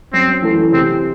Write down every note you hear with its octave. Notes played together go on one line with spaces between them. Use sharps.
F#2 C4
E3 A3 E4 A4
C3 C4